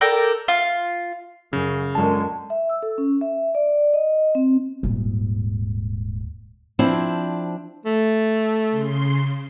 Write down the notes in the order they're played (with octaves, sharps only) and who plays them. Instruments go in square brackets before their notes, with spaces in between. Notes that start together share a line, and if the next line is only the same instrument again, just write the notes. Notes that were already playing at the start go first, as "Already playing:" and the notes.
[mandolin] A4 A#4 D5 G5
F4
[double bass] F#2 [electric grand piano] C#3
[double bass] F#2 [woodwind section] A#2 D3 G#3 [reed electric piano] A5
[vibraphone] E5
E6
A4
C#4
E5
D5
D#5
C4
[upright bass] D#1 G#2
[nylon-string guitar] F3 C4 D4 E4 C5
[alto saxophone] A3
[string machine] C#3 C6